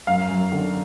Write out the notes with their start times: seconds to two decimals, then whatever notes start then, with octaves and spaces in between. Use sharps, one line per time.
0.07 F#2 F5
0.29 F#2
0.52 D3